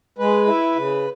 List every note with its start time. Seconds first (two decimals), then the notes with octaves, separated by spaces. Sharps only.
0.18 G#3 B4
0.47 E4
0.75 C#3